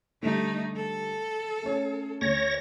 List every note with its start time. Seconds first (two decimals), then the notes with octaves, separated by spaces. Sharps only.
0.23 D3 G3 A3 D#4
0.76 A4
1.62 A3 C#4 C#5
2.21 D2 C#5 A#6